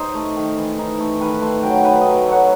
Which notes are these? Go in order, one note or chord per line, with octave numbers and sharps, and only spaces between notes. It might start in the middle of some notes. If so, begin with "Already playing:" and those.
Already playing: D#4 C5 D#5
A3
D#3
E3
D#4
A3
D#3 B4
A3 C5
F#3 G5
D#4 B4
A3 D#5
F#3 F#5